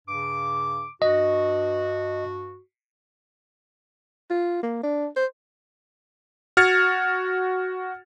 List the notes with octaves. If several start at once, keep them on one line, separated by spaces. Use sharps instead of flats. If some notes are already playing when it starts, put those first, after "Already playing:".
G2 C#3 D6
G2 F#4 D#5
F4
A#3
D4
C5
F#4 F6 G#6 A6 C#7